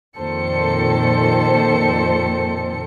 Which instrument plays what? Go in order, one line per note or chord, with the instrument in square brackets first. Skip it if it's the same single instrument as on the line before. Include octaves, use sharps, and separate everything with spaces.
[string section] F2 A#2 D#3 A4 C5 C#7